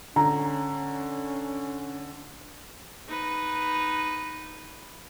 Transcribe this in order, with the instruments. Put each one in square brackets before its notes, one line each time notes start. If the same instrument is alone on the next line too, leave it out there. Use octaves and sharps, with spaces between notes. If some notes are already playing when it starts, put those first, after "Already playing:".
[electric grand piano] D3 [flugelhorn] C#4 [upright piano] A#5
[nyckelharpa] D#4 B4